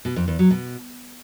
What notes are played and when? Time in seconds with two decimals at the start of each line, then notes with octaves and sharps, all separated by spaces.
0.05 B2
0.16 F2
0.28 E2
0.39 F#3
0.50 B2